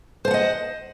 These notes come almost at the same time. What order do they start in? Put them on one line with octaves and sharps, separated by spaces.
C5 A5 F#5 D#5